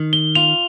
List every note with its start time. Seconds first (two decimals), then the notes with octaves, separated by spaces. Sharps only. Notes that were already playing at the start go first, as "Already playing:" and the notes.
Already playing: D#3
0.13 G7
0.35 F4 F7